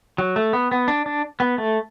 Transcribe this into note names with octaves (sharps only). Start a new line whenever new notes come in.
F#3
A3
B3
B3
D4
D4
B3
A3